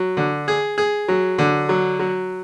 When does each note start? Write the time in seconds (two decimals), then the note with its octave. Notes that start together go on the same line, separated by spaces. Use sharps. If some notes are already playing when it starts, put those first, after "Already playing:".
Already playing: F#3
0.17 D3
0.48 G#4
0.78 G#4
1.08 F#3
1.39 D3
1.69 F#3
1.99 F#3